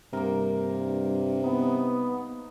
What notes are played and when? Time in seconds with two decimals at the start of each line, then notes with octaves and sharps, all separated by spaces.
0.13 G2 C3 A#3 A#4
1.44 B3 D#4